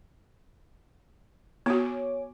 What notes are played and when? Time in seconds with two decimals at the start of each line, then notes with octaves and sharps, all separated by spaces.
1.66 B3 F#4 C#5 G#5 D6